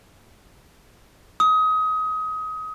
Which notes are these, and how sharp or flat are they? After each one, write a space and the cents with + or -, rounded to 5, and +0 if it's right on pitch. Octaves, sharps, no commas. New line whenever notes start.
D#6 +25